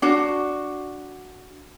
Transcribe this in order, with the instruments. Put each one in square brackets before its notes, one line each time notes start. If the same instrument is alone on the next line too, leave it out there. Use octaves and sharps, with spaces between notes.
[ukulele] D4 F#4